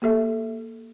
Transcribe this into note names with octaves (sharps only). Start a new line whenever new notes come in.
A#3 G4 A4 E5